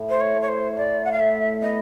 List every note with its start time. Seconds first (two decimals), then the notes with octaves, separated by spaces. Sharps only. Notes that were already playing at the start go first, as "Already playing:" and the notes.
Already playing: A2
0.10 C5
0.21 C#5
0.35 A3
0.42 C#5
0.48 C5
0.77 A2 D5
1.05 F#5
1.12 F5
1.19 A2 E5
1.62 B3 D#5